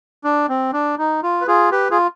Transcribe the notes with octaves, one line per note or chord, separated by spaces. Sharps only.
D4
C4
D4
D#4
F4
B4
F4 G#4
G4 B4
F4 G#4